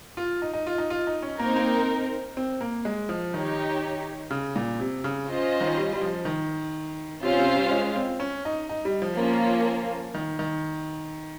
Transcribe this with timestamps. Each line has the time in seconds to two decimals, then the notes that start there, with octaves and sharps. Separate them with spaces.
0.17 F4
0.42 D#4
0.53 D#4
0.67 F4
0.78 D#4
0.90 F4
1.07 D#4
1.22 C#4
1.39 A#3 C4 D#4 A#4
1.56 A#3
2.37 C4
2.61 A#3
2.85 G#3
3.09 F3
3.34 D#3 D#4 G4 C#5
4.31 C#3
4.56 A#2
4.80 C3
5.04 C#3
5.28 C#4 F4 C5 D#5
5.61 D#3
5.78 G3
5.93 G3
6.02 F3
6.25 D#3
7.23 C3 C#4 F4 C5 F5
7.39 C3
7.55 G3
7.71 G#3
7.96 C4
8.20 C#4
8.45 D#4
8.69 D#4
8.85 G3
9.02 F3
9.18 A#3 C#4 F4
10.14 D#3
10.39 D#3